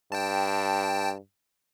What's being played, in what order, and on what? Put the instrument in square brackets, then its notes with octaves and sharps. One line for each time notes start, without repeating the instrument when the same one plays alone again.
[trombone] G2 [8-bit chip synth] G5 A5